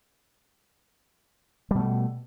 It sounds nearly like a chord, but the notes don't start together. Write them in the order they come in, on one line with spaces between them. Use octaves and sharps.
G3 B2 A3